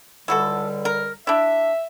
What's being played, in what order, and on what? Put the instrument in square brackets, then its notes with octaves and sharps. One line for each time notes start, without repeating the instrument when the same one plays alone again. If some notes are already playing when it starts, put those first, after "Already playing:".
[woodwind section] C#2 D3 G3 [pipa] E4 F#4 A4
[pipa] A#4
[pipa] D4 E4 [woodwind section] E5